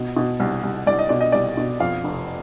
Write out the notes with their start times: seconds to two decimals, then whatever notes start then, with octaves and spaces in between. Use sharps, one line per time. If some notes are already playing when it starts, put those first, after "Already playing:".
Already playing: B2
0.16 B2
0.40 C2
0.63 C2
0.87 C2 D5
0.99 D#5
1.09 B2 D5
1.21 D#5
1.32 C2 D5
1.57 B2
1.80 F2 F5
2.04 F1